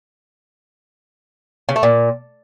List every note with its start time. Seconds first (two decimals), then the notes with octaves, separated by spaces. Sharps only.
1.69 C#3
1.76 A3
1.83 A#2